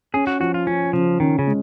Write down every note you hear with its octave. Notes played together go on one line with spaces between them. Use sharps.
C#4 G#4
F#4
F3 F#4
F4
F3 C#4
C#3 F3
D#3 C#4
C#3
G#3